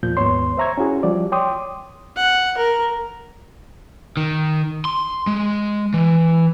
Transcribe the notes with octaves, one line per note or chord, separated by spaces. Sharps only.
E2 A#2 F3 G6
D#2 G#2 B3 C#5 C6
C5 E5 A#5 C#6 G#6
C#4 E4 F#4 G#4
F3 G3 D5
C#5 G5 C6 D6 D#6
F#5
A#4
D#3
C6
G#3
E3